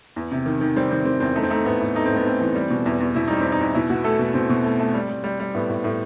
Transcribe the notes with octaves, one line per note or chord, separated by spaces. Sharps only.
E2
C3
D#3
D#3
G3 C4
D#3 C4
D#3 C4
E2 C4
A3 D#4
C4
A3 D#4
A2 B3
A2
A3 D#4
A2 C4
B3
A3 C4
E3
G3
B2
E2
E2
B2 E4
G3 D#4
E2 C4
D#4
E2
B2 E4
B2 F#4
A3 A4
B2 A4
B2 C4
B2
A3
A3
G3
G3
G3
G3
A2 B3
A2
A2